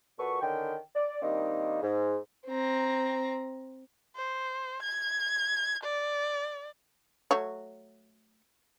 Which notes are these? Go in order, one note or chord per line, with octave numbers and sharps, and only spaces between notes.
A#2 F#4 A4 B4 C#6
D3 D#3 C#4 G5
D5
D#3 G3 A#3 C4 D4 D#4
G#2
C4 A#5
C5
G#6
D5
F#3 A3 C#5